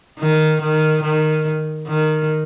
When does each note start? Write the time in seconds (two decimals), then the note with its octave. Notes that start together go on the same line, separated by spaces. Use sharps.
0.19 D#3
0.61 D#3
1.02 D#3
1.87 D#3